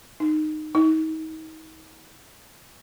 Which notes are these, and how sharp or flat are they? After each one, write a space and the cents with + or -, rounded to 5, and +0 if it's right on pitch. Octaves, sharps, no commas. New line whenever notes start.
D#4 -15
D#4 +35